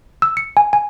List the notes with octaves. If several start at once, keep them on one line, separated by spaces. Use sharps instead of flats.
E6
C#7
G#5
G#5